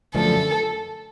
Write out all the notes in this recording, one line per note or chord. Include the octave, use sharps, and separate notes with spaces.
F#2 D3 F3 A3 A4